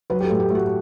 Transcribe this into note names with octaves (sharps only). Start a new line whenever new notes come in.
F#3 B4
G4
A4
A2
G4
A3 F#4